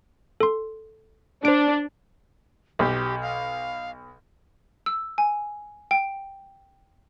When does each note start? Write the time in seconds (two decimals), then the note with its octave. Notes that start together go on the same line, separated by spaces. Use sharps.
0.40 A4 C6
1.45 D4 C5 D7
2.79 B1 G4
3.22 F5
4.86 E6
5.18 G#5
5.91 G5